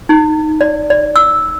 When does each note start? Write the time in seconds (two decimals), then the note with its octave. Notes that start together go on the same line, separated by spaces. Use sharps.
0.09 D#4
0.61 D5
0.90 D5
1.16 E6